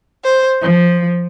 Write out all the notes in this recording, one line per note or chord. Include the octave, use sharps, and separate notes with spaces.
C5
F3